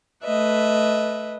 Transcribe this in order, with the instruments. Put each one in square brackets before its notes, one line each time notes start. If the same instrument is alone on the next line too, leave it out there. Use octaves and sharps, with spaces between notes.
[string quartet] A3 B4 D#5 E5